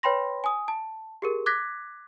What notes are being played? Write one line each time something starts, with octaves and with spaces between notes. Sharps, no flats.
B4 C#5 G5 B5 C6 A#6
G#5 D#6
A5
G4 G#4 A#4
D6 F#6 G#6 A#6 B6